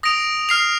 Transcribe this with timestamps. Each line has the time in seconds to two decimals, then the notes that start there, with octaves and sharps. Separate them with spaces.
0.03 D#6 A#6 D7 F7
0.49 F6 C7 F7